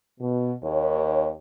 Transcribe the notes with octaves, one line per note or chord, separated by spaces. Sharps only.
B2
D#2 C#5